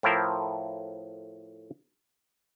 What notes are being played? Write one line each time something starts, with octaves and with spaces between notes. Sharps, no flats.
A2 F3 E4 A#4 C5